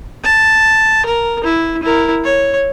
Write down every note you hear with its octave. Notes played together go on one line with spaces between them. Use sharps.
A5
A#4
E4
E4 A#4
C#5